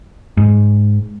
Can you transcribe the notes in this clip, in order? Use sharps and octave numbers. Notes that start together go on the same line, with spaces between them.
G#2